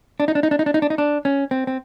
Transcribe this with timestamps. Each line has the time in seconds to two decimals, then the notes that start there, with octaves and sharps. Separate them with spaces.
0.20 D4
0.28 D#4
0.35 D4
0.43 D#4
0.51 D4
0.59 D#4
0.66 D4
0.74 D#4
0.82 D4
0.90 D#4
0.98 D4
1.25 C#4
1.51 C4
1.67 C4